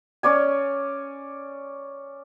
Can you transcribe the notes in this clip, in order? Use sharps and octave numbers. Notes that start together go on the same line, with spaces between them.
C#4 C#5 D5 G#5